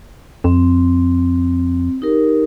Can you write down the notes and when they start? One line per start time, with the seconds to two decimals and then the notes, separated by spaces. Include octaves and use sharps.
0.44 F2 C4
2.02 D#4 G4 A#4